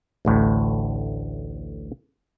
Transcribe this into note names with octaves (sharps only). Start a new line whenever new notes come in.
A1 D2 A2